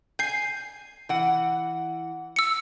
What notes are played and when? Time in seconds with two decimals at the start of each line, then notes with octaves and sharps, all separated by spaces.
0.19 G#5 G6 C7
1.09 E3 F#5
2.36 E6 C#7